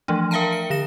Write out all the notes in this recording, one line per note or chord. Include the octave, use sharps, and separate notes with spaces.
E3 F3 A3 D4
A#4 E5 F5 G5 A5 A#5
C#7
D3 A#6 E7